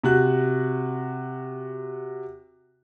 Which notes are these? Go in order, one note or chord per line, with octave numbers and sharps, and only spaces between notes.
C3 F#4 F#6